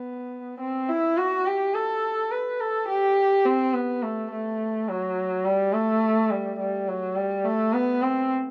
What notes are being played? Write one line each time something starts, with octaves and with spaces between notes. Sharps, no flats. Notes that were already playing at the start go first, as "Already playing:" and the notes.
Already playing: B3
C4
E4
F#4
G4
A4
B4
A4
G4
C4
B3
A3
A3
F#3
G3
A3
G3
G3
F#3
G3
A3
B3
C4